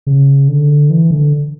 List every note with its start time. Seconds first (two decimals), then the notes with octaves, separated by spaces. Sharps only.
0.07 C#3
0.48 D3
0.90 E3
1.11 D3